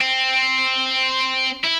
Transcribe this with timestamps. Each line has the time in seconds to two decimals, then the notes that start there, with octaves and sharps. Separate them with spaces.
0.01 C4
1.64 E4